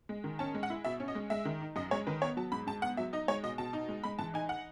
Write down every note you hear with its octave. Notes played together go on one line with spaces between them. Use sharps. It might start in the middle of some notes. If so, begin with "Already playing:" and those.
G#3
D#3
C#4 A5
G#3
F#5
E4
B2 E5
C#4
D#5
G#3
G#3 E5
D#3
D#4
F#2 D#5
G#3 C#5
D#3 B4
B3 C#5
F#3 A5
G#2 B5
G#2 A5
B3 F#5
F#3 E5
D#4 D#5
G#3 C#5
B2 D#5
B2 A5
D#4
G#3
G#3 B5
E3 A5
D#4 G#5
F#5